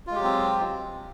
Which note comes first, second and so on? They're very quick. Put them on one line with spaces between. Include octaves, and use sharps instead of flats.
F4 G#3 G4 F#3 C4